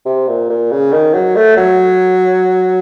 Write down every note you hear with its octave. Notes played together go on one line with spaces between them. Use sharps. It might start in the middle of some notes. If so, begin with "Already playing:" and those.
C3
A#2
A#2
C#3
D#3
F#3
A3
F#3